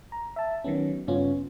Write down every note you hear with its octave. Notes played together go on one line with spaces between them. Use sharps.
A#5
E5 A5
D#3 F#3 B3 C#4
G2 C#3 B3 C#4 F4